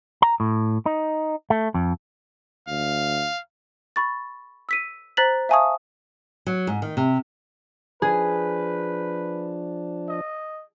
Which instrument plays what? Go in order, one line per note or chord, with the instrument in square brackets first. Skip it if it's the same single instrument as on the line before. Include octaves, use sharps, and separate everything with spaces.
[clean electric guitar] A#5
A2
D#4
A3
F2
[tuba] D2 [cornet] F5
[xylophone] B5 C#6 A6
E6 B6 D#7
C5 A#5 F#6 A6 B6 F#7
E5 F5 G#5 A5 C#6 D#6
[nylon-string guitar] F#3
G#2
D#3
C3
[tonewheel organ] F3 D4 [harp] G#4 [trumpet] B4
[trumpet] D#5